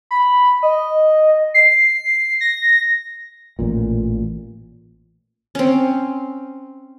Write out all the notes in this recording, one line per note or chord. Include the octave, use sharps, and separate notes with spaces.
B5
D#5
C7
A#6
A1 A#2
C4 C#4